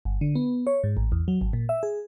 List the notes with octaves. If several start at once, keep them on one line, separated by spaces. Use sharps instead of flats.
G1
D3
B3
C#5
G#2
A1
E2
F#3
G#1
A#2
E5
G#4